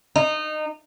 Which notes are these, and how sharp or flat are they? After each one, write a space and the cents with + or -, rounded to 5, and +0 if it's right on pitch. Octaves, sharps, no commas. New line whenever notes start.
D#4 -20